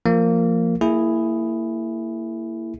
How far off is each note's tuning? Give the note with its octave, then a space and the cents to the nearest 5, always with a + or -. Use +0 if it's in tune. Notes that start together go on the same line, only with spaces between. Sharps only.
F3 -5 A#3 -15
A#3 -20 E4 +5 G#4 +0